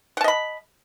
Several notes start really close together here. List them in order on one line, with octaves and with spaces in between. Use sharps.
F#5 A5 D#5 B5